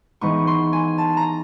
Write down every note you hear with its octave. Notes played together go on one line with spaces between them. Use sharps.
E3 G#3 B3 D#4 C#6
C6
G#5
A5
A#5